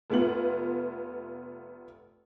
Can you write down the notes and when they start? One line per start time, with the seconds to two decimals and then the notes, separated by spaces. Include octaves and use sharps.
0.10 F1 A3 B3 F4 F#7